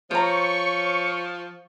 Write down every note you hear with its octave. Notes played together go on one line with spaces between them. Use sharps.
F3 C5 C#5 A#5 C#6